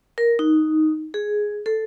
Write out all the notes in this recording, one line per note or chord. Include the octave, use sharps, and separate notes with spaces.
A#4
D#4
G#4
A4